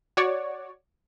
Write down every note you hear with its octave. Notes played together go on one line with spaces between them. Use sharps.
F#4 C#5 D5